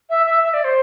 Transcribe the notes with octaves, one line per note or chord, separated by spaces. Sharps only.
E5
E5
E5
D5
C5